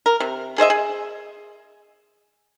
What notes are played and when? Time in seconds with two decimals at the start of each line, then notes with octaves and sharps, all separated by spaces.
0.06 A#4
0.20 C3
0.58 G#4 C5 D#5 E5
0.70 G#4